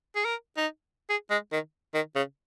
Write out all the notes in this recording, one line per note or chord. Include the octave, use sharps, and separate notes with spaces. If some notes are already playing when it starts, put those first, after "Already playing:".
G#4
A#4
D#4
G#4
G#3
D#3
D#3
C#3